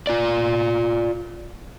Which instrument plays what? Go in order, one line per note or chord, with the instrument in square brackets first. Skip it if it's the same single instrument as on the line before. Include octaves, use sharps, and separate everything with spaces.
[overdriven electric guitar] F4 D5